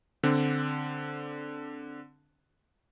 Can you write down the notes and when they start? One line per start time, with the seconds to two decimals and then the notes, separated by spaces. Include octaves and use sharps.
0.23 D3 C4 D4